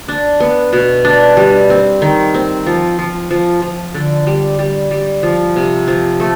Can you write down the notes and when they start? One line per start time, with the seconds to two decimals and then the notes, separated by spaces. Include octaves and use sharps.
0.08 D4
0.40 B3
0.73 B2
1.05 D4
1.37 G3
1.70 C4
2.02 D#3
2.34 C4
2.66 F3
2.99 F3
3.31 F3
3.62 F3
3.94 D3
4.27 G3
4.59 G3
4.91 G3
5.23 F3
5.56 C3
5.88 F3
6.20 A3